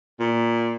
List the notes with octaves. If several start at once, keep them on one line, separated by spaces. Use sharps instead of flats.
A#2